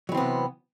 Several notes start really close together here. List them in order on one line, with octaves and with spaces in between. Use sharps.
F#3 E3 C4 B3 C3